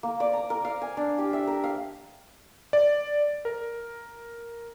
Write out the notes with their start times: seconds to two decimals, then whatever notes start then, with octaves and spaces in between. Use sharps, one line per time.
0.03 A#3
0.20 D5
0.33 A#5
0.50 A#4
0.65 F5
0.82 G#5
0.97 D4
1.18 G4
1.33 E5
1.47 A#4
1.64 F5
2.73 D5
3.45 A#4